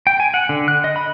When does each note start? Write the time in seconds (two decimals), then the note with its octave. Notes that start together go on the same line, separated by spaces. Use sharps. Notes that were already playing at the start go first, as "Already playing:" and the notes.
0.07 G5
0.20 G#5
0.34 F#5
0.49 D3
0.68 F#6
0.84 D#5
0.96 B5